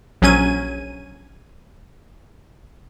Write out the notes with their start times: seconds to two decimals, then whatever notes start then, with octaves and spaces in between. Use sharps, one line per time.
0.22 A#1 F#3 C#4 G#6 D#7